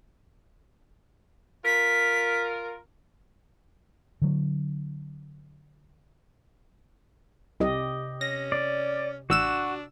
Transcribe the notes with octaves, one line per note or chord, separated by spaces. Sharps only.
F4 A#4 B6
D3 F#3
C2 C3 G4 D#5
C#4 A#6
D5
A1 D4 F#4 E6 E7